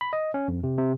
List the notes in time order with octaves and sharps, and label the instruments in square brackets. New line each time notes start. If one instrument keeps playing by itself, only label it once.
[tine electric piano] B5
D#5
C#4
F2
C3
C3